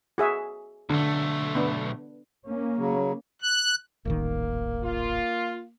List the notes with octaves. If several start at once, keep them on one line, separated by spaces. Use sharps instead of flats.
F#4 G#4 E5
B1 D3 A3
B3 D4
A#3 C#4
C#3 F#3
F#6
D#1 A1 D#3 A#3
F4